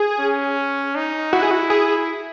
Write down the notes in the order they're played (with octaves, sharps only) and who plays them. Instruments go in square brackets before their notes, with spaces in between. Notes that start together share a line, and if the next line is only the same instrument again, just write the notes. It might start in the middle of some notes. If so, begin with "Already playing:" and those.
Already playing: [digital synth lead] G#4
[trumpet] C#4
D#4
[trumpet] E4 [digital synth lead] F#4
[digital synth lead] G#4
F#4
G#4